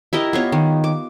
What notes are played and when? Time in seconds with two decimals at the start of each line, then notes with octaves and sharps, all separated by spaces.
0.13 E4 G4 A#4 D#5
0.33 B3 F4 C#5
0.52 D#3
0.84 D6